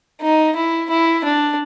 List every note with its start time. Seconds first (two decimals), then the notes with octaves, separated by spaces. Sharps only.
0.21 D#4
0.56 E4
0.90 E4
1.24 D4